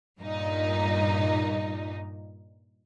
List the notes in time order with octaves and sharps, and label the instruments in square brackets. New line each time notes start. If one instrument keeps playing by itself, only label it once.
[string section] G2 A#2 D#4